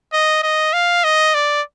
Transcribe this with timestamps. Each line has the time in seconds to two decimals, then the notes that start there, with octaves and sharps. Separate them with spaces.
0.13 D#5
0.43 D#5
0.73 F5
1.04 D#5
1.35 D5